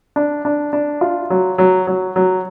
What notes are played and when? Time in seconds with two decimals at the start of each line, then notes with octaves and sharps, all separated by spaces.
0.16 D4
0.45 D4
0.73 D4
1.01 F4
1.30 F#3
1.58 F#3
1.87 F#3
2.16 F#3